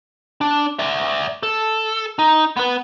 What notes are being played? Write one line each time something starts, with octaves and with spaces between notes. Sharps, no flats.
D4
D5 E5
A4
D#4
B3 B4